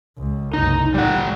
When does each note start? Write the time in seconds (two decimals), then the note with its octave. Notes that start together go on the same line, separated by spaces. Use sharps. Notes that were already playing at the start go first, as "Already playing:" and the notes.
0.18 C#2
0.53 F#1 C2 D#4
0.94 A1 G3 F#5